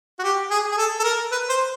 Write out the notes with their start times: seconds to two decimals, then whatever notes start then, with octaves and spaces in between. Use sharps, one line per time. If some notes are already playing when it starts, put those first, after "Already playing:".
0.19 F#4
0.23 G4
0.50 G#4
0.71 G#4
0.77 A4
0.99 A4
1.04 A#4
1.31 B4
1.49 C5